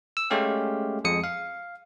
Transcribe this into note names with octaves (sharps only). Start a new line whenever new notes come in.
E6
G#3 A3 C#4 G4 F5
F2 G#3 D#6 C#7
F5